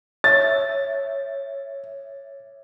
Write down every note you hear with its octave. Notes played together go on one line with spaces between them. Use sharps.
C#5 E5 A6